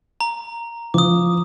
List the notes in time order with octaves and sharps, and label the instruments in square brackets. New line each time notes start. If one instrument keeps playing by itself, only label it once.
[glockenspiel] A#5
[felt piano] F3 [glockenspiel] D6 D#6